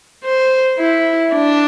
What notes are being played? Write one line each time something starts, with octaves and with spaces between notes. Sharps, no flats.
C5
E4
D4